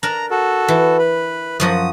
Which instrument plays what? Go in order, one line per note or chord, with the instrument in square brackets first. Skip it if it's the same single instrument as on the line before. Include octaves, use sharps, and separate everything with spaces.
[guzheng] D4 A#4 [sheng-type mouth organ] A#5
[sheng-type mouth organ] F#4 A4
[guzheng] E3
[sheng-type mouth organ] B4
[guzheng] F#2 F3 F#4 [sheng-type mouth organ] D#6